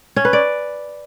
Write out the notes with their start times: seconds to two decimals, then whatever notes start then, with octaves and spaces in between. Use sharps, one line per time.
0.16 C#4
0.25 B4
0.33 D5